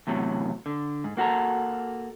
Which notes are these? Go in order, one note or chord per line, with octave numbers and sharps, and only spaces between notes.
E2 A2 C3 F#3
D3
G#2
A#3 F#4 A4 A#5